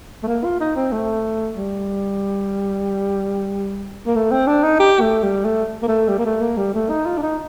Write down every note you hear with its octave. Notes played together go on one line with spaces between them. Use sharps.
A3
A#3
F4
D#4
C4
A3
G3
A#3
A3
C4
D4
D#4
G4
A3
G3
A3
A#3
A3
G3
A#3
A3
A#3
G3
A3
D#4
F4
D4
D#4